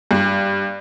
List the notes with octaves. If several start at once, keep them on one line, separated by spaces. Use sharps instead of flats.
G2